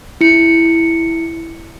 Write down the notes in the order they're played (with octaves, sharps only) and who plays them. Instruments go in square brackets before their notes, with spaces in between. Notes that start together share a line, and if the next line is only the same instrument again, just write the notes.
[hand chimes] E4 C#7